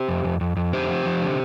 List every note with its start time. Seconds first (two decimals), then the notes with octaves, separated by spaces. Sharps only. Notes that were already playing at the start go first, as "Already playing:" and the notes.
Already playing: G4 C5
0.08 F2
0.25 F2
0.41 F2
0.56 F2
0.73 D3 G4 C5
0.90 F3
1.05 F3
1.22 D3